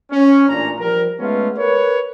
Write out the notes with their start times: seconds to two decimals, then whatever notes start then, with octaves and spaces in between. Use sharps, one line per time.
0.11 C#4
0.49 A1 A#2 D4 A#5
0.79 F3 G3 A#4
1.20 G#3 A3 B3 C#4 F4
1.57 A#4 B4 C#5